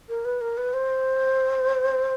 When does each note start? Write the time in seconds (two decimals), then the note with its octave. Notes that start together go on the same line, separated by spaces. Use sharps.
0.09 A#4
0.25 B4
0.41 A#4
0.57 B4
0.74 C5